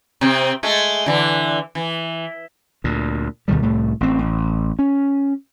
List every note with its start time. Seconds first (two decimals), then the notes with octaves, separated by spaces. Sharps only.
0.21 C3 C4
0.63 G#3 A3
1.06 D3 E3
1.75 E3
2.84 D2 A#2
3.48 D2 B2 D#3 G3
3.62 C2 A2 A3
4.01 A1 C4
4.19 A1
4.79 C#4